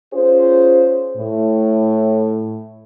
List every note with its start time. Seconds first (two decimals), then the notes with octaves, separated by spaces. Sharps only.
0.14 C#4 F4 G#4 C5
1.17 A2